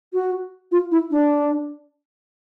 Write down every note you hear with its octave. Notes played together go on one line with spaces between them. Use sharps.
F#4
F4
E4
D4